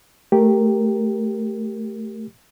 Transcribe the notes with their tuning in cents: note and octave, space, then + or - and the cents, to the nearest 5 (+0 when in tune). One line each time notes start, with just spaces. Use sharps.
A3 +0 G4 +0 A#4 +0